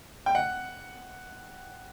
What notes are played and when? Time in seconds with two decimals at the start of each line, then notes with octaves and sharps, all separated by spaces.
0.26 G5
0.35 F#5